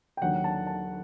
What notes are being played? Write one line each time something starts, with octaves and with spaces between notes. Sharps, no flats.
G5
D#2 D3 F#3 F#5
A5
A5